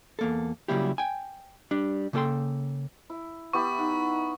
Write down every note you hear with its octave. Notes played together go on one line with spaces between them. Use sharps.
E2 A#3 A4
C#3 F#3 G3 A#3 E4 G4
G5 G#5
G3 D4
C#3 A#3 G#4 A4 G5 C6
E4
B3 E4 G4 B5 C#6
D#4 F#5